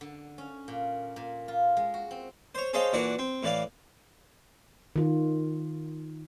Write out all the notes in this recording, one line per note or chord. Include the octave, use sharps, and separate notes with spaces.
D3
C#4
A#2
A#2
F4
G#3
F#4
C4
C5 C#5
G#4 A4 C5 C#5 D#5 F5
A#2 E3 D4 F#4 F#5
C4
A2 E3 D5 F5
D#3 F4